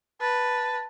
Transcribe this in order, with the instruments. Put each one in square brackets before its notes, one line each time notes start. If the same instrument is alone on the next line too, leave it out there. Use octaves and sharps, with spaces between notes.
[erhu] B4 [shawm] A5